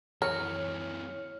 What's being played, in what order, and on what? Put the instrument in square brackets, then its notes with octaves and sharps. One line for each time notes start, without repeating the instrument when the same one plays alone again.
[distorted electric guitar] F#2 E3 [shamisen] A#4 [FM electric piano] C#5 C#7 [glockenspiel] F6